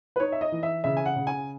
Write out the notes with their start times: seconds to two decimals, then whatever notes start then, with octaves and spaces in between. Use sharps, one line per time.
0.16 B4
0.20 D#4 C#5
0.32 E5
0.41 D#5
0.52 E3
0.63 E5
0.84 C#3 E5
0.97 G#5
1.06 F#5
1.16 C#3
1.27 G#5